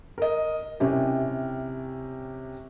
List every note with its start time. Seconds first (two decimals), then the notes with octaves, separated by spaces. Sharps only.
0.18 A#4 D#5
0.80 C3 C#4 E4 G4